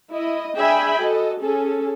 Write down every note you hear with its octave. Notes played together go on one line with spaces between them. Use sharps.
E4 D#5
D4 G#4 E5 G5 G#5 B5
F#4 A4 D#5
C#4 G#4 A4